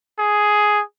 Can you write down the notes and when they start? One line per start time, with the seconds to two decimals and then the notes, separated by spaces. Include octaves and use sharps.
0.19 G#4